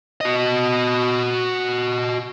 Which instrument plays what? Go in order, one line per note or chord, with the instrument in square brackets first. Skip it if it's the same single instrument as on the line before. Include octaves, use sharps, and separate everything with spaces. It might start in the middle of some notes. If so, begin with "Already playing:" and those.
[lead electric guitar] F#4 D#5